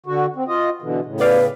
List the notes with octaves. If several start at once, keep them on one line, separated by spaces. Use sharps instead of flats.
D3 F#4
C4
F4 D#5
B2 D3 E3
A2 C#3
B3 B4 D5 F5